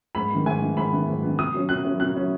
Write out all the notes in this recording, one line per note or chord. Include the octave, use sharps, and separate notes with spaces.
G#2 B5
D#3 B3
G#2 G#5
D#3 B3
G#2 B5
D#3 B3
G#2
D#3 B3
B2 D#6
F#3 C#4
B2 F#6
F#3 C#4
B2 F#6
F#3 C#4